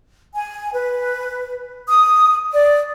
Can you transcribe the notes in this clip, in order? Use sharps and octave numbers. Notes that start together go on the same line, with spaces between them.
G#5
B4
D#6
D5